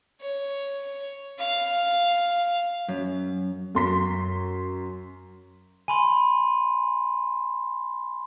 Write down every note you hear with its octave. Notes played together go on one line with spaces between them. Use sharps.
C#5
F5
F#2
F#2 C6 B6
G#5 B5 C6